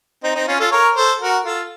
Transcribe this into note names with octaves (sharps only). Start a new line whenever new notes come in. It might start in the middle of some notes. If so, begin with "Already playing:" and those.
C4 D#4
C4 D#4
C#4 F4
F4 A4
A#4 C#5
A4 C5
F#4 A#4
F4 A4